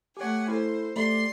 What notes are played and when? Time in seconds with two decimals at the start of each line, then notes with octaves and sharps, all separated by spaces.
0.17 A3 G4 C#5 F#5 G#5
0.48 E4 A4 C5
0.96 A3 G4 D5 C6